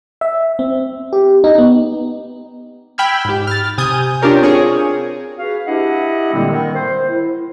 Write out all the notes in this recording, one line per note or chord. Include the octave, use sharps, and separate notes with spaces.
E5
C4
G4
D#4
B3
G5 B5 E6 F6 G#6
G#2 G4
F6 A6
C3 G#5 D#6 G6
D4 F4 G4 A#4 C#5
C4 F4 G#4 C#5
F#4 G#4 B4 F5
D4 E4 G4 D#5 E5 F#5
A#2 D3 G3 G#3 A#3 C4
D#3
C5
E4